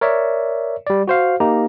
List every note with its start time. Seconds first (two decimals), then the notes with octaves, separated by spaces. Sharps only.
0.01 A#4 C#5 D5 E5
0.87 G3 D5
1.08 F#4 C5 F5
1.40 A#3 D#4 G4 A#5